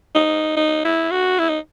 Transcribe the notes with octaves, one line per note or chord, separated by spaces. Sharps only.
D#4
D#4
E4
F#4
E4
D#4